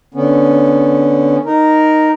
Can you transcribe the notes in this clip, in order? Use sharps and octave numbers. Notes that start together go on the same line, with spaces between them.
D3 B3 C#4
D#4 A#4